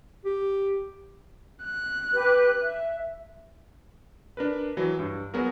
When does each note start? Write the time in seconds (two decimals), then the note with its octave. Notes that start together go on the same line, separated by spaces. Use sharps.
0.25 G4
1.64 F#6
2.12 G4 B4
2.60 E5
4.37 D4 A#4 B4
4.77 E3 F#3
4.99 G2
5.34 F#3 B3 F#4 G#4 A#4